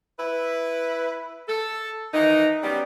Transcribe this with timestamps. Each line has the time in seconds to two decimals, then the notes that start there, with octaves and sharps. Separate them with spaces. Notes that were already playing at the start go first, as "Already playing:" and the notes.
0.19 E4 B4
1.48 A4
2.14 D#3 E3 D#4
2.63 F#3 G3 B3 C#4 G4